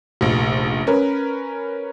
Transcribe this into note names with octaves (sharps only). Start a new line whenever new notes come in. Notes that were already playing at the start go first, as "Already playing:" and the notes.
F1 A#1
C#4 A#4 B4